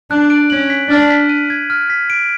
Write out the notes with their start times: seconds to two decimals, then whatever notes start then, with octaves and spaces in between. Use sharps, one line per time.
0.11 D4 F#6
0.30 D7
0.50 C#4 F#7
0.70 B6
0.90 D4 F6
1.10 B6
1.29 D#7
1.50 G#6
1.70 F6
1.90 B6
2.10 D7